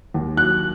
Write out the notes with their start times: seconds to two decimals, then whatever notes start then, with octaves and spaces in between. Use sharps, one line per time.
0.14 D#2
0.37 F#3 F#6